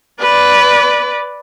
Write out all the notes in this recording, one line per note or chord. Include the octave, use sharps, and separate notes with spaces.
B4 D5